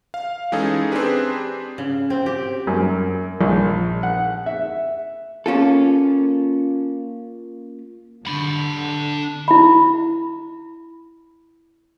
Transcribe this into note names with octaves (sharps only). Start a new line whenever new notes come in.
F5
E3 G#3 C#4 D#4 G#4 A4
C4 D4 G4 G#4 B4
C#3
C4
G4
F#2
A#1
F#5
E5
A#3 C#4 F4 A4
D3 D4 B5
E4 B5